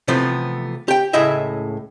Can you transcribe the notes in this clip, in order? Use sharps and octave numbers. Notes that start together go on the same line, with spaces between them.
C3 E3 F3 A3 B3
G4 G5
C#2 A2 E4 G#4 D#5 E5